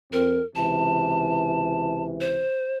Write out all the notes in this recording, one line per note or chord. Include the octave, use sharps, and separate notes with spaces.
F2 C4 A#4
C#2 C3 E3 A5
C5